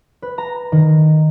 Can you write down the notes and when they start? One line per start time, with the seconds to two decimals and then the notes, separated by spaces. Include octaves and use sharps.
0.22 B4
0.38 A#5
0.72 D#3